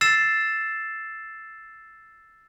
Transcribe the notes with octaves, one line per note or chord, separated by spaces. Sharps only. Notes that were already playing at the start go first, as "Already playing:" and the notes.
E6 A6 C7 E7